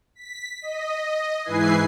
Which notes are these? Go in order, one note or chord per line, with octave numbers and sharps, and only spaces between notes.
B6
D#5
G#2 E3 E4 B4 G#5 C7